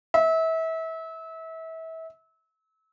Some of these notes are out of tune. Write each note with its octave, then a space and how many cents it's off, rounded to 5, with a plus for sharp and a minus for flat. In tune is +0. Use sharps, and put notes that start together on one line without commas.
E5 -30